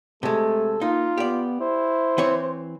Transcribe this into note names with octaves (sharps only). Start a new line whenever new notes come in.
C3 G#3 A3 A4
A#3 D#4 F4
B3 G4 D5
E4 C5
E3 C4 C#5